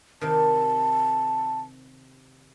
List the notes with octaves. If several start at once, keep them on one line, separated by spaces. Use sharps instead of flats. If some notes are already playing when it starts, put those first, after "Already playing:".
C3 D#3 A5